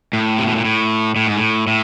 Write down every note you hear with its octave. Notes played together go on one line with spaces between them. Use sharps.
A2
C3
B2
A#2
A2
A2
G#2
A2
A2